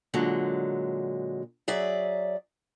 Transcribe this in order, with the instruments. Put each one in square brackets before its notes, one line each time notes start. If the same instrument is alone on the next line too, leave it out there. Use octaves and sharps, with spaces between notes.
[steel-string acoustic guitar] A#2 D3 F#3 G#3
F#3 G#4 D5 E5